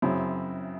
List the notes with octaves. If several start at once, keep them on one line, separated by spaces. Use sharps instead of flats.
F#2 C#3 F#3 C4 E4